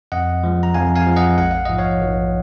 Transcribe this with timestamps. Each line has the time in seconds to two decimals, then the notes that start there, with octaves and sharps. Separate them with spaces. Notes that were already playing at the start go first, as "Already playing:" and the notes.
0.12 F2 D#5 F#5
0.44 F3 G#3
0.63 A#5
0.74 F2 F5 G#5
0.96 F5 G#5
1.07 F3 G#3
1.16 D#5 F#5
1.38 A#1 F#5
1.51 F5
1.66 G#2 F3 D#5
1.79 C#5 F5
2.01 A#1